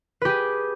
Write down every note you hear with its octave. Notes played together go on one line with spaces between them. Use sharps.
G4 G#4 B4